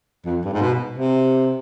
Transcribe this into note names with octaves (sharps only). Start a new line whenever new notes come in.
F2
G2
G#2
B2
C3